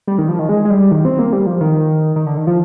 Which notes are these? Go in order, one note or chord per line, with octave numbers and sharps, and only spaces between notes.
G3
D#3
F3
D#3
G#3
G#3
G3
D#3
C4
A#3
G3
F3
D#3
D#3
D3
D#3
F3